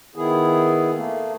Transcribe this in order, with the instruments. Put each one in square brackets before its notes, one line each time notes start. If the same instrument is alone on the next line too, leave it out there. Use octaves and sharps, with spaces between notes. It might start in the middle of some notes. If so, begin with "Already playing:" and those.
[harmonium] D#3 B3 E4 G#4
A3 A#3